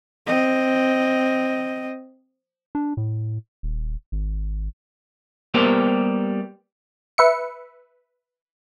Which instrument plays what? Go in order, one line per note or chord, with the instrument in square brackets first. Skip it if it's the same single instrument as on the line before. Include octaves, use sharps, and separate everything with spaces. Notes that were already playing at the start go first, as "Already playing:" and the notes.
[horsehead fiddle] C4 D#5
[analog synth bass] D4
A2
D#1
G#1
[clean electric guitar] G3 A#3 B3 G4 A#4 C5
[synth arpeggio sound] B4 E5 C#7